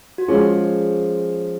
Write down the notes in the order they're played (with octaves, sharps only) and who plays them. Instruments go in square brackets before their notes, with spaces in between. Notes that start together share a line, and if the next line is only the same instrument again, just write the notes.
[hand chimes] F#4
[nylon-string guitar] F3 G#3 C#4 F4 [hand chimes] G#4